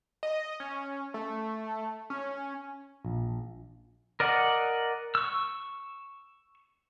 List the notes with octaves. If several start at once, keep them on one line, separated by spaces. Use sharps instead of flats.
D#5
C#4
A3
C#4
A#1
A#4 D5 D#5 F#5
C#6 E6